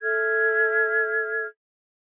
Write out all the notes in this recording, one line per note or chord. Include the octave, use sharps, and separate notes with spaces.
A4 E5 F6 G#6